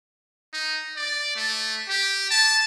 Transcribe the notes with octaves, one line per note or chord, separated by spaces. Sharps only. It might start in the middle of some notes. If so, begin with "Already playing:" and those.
D#4
D5
A3
G4
A5